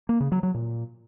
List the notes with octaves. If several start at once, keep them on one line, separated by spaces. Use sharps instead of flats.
A#3
C#3
F#3
F#3
A#2